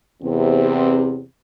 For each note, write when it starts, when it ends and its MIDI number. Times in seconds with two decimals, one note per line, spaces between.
0.23 1.22 40
0.23 1.22 48
0.23 1.22 60